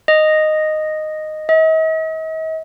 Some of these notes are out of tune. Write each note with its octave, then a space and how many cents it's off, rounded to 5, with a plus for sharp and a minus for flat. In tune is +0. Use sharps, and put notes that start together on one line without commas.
D#5 -5
D#5 +45